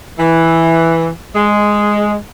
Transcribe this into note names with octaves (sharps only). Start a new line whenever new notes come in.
E3
G#3